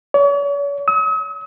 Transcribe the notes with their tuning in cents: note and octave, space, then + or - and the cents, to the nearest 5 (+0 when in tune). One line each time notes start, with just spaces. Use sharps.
C#5 +45
D#6 +45